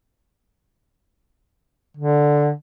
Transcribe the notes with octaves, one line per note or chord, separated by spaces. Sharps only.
D3